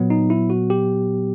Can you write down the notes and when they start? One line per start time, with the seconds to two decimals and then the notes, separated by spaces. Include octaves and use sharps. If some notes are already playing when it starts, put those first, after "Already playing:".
Already playing: A#2 F#3 B3
0.10 D#4
0.30 E4
0.50 F#4
0.70 G4